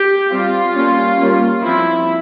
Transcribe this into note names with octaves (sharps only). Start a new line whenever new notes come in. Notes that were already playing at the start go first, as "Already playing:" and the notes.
Already playing: G4
G3 C4 F4
G3 A#3 C#4
G3 A#3 C#4
F3 C4 E4